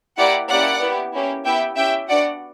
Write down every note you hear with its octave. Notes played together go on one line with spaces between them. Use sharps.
A#3 E4 G4 D5 F#5
A#3 C#4 E4 G4 D5 F#5
B3 E4 G4
A#3 C#4 E4 G4
B3 E4 G4 E5 G5
C#4 E4 G4 E5 G5
B3 D4 F#4 D5 F#5